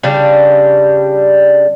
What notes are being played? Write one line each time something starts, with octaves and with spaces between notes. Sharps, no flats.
C#3 G3 D4